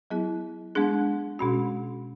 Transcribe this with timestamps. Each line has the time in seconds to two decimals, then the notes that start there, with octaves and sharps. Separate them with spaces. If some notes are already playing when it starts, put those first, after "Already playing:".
0.10 F#3 B3 E4 G#4
0.75 G#3 B3 D4 G#4
1.39 B2 G#3 C#4 F#4